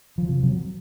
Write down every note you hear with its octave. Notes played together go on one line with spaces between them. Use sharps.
F3
C3
F#3